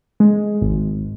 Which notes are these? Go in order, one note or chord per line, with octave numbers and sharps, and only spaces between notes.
G#3
G#1